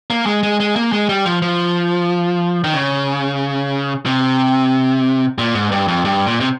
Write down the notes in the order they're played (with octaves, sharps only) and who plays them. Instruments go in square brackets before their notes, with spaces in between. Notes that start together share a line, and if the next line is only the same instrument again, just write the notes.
[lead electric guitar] A#3
G#3
G#3
G#3
A#3
G#3
G3
F3
F3
D#3
C#3
C3
A#2
G#2
G2
F2
G2
A#2
C3